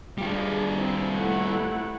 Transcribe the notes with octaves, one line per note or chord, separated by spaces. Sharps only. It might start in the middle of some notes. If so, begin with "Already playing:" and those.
G3 D4 F4 G#4
C4 E4
A3 E4 F#5